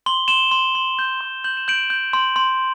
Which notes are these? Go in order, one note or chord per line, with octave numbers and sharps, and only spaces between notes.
C6 G7
C6 E7 G7
C6
C6
G6
C6
G6 F#7
E7
G6 D7 F#7
G6
C6
C6